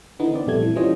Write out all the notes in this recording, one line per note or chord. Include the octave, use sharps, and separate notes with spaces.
D3 E3 B3 D#4
B3 C4 D5
A#1 F2 G3 A3 G#6
E3
E3 F3 G3 C#4 C5 D#5